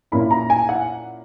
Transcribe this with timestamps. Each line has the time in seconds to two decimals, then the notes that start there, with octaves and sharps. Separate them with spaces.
0.12 A#2 A#3 C#4 E4 B5
0.31 A#5
0.50 G#5
0.69 F#5